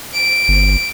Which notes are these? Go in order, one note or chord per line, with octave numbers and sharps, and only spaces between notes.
D7
G1